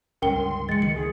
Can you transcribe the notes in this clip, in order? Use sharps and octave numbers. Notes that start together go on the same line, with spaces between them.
C#2 G2 D3 C#4 A#4 G5 G7
C6
E3 G#3 A6 C#7
C#2 D#3 A3 C#7
G#4